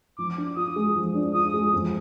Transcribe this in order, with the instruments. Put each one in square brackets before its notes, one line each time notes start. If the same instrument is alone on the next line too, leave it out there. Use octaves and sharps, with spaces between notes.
[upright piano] F3 [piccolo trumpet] D6
[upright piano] D4
[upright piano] F4 [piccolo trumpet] D#6
[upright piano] G#3
F3
D4
[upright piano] F4 [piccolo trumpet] D#6
[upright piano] G#3
F2